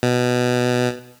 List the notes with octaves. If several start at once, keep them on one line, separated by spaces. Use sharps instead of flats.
B2